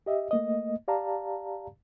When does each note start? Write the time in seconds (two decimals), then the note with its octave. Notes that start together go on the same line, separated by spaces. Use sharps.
0.06 G4 D#5 E5
0.31 A3 A#3 D#5
0.88 G4 D5 F5 A5 A#5